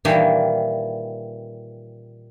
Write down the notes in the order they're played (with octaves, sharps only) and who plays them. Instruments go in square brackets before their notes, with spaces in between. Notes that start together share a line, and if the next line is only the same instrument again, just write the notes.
[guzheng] A#2 D#3 E3 G3 D#4 A#4